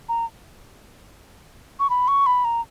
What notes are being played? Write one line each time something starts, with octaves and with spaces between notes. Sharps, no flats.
A#5
C#6
B5
C#6
B5
A#5